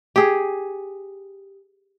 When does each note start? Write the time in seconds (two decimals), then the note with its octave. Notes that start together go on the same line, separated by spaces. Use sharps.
0.16 G4 G#4